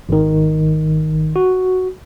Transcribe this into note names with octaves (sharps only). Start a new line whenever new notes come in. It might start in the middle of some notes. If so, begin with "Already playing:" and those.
G#1 D#3
F#4